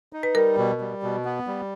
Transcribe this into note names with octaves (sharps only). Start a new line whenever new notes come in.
D#4
B4
G3 A#4
B2
G3
B2
B3
G3